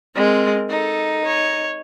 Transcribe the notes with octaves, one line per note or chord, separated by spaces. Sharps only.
G#3 C4 A#4
D#4 A4
C#5